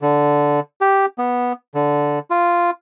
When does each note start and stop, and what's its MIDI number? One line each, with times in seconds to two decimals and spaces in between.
0.02 0.60 50
0.81 1.06 67
1.18 1.53 59
1.75 2.19 50
2.31 2.70 65